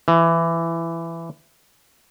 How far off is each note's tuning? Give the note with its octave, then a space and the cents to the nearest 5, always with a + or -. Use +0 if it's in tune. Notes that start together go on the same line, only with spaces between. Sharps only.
E3 +15